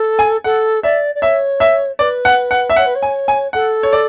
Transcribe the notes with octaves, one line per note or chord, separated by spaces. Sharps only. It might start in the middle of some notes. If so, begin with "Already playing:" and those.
Already playing: A4
G#5
A4 F#5
D5 E5
D5
C#5 E5
E5
B4 D5
F#5
F#5
E5
C#5 F#5
B4
C#5
G#5
G#5
A4 F#5
C#5
D5